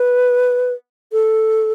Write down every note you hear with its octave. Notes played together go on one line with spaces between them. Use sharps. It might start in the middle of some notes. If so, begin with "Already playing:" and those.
Already playing: B4
A4